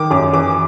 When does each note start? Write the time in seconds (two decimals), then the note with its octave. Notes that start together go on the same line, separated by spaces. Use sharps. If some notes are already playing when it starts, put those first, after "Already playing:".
Already playing: D#3 D6
0.10 F#2 D6
0.33 E3 D6